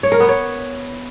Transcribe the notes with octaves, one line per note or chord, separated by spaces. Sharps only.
C#5
A#4
B3
C#5